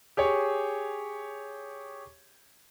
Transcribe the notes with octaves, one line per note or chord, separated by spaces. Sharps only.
G4 G#4 C#5